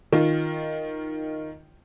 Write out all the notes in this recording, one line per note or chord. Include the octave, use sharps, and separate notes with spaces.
D#3 F4